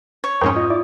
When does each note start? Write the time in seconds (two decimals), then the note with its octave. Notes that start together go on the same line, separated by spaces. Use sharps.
0.24 C#5
0.41 F2 G#2 C#4 A#4 C5 G5 D#6
0.56 F4 D#5
0.70 E4 D5